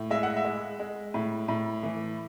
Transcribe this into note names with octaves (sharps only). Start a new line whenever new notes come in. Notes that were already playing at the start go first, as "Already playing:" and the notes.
Already playing: A2
G#3 E5
F#5
E5
G#3
G#3
A2
A2
E3